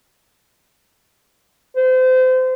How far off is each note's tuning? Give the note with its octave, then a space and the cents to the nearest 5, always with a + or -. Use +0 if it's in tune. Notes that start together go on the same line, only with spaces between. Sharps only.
C5 -30